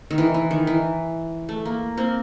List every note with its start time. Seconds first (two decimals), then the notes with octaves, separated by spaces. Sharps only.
0.11 D#3
0.18 E3
0.34 E3
0.51 D#3
0.67 E3
1.49 A3
1.65 A#3
1.97 A#3 C4